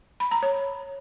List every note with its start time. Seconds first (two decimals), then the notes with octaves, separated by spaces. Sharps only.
0.20 B5
0.31 A#5
0.43 C#5